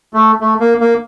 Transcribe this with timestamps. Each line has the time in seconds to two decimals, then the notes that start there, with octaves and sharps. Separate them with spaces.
0.14 A3
0.40 A3
0.60 A#3
0.80 A#3